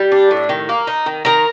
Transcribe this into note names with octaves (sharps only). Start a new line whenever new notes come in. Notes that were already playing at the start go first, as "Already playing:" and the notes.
Already playing: G3
D4
A2
D#3
A#3
D#4
D#3
D#3 A#4 A#5